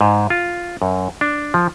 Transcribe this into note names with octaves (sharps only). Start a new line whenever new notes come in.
G#2
F4
F#2
D4
F3